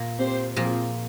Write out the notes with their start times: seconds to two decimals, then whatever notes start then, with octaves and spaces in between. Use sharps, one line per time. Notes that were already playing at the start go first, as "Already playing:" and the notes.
Already playing: A#2 A#3
0.18 C4 G4 C5
0.56 A#2 F3 A#3 C4 F4 G#4